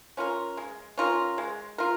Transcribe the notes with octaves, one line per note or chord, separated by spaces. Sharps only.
C#4 F4 A#4
G#3
C#4 F4 A#4
G#3
F4 A#4